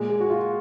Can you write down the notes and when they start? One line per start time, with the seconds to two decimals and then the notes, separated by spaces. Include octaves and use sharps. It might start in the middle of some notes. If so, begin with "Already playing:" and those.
Already playing: A#2 G#3
0.09 G#4
0.20 F#4
0.30 F4